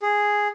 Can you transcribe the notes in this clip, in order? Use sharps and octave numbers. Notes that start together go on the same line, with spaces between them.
G#4